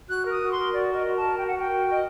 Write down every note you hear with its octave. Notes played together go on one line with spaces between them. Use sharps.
F#4 F#6
A#4 D#6
F#4
A#4 C6
F#4 D5
A#4 D#5
F#4
A5
A#4
F#4 G5
F#5
A#4 G5
F#4
A#4 D#5